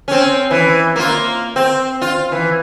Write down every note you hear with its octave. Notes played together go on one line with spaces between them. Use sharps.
C4 C#4
E3
A#3 F4
C4
F4
E3